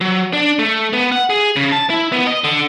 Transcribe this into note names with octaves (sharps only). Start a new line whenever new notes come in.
F#3
D4
A3
B3
F#5
G#4
C#3
A5
E4
B3
D#5
D3